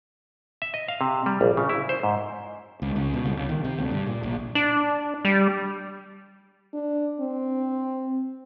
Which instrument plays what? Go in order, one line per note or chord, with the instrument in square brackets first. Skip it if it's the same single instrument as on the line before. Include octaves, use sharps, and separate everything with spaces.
[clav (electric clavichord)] E5
D#5
F5
C3
G3
A#1
C#3
E4
C5
G#2
[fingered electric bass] C#2
C#2
B2
C2
C#2
D#3
C3
D2
G2
A#2
A#1
[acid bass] D4
G3
[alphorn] D4
C4